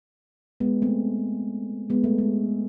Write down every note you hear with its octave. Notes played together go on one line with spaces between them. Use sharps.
G#3 B3
A3 C4
G#3 B3
A3
G#3